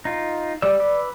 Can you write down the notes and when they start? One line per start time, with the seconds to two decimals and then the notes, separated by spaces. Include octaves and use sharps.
0.05 D#4 F4
0.62 G3 D5 E6
0.80 B4 D6 E6